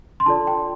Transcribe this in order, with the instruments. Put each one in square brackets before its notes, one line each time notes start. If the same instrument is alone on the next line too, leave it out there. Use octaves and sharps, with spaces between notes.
[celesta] C6
D4 F4 A4 D5 A5
G5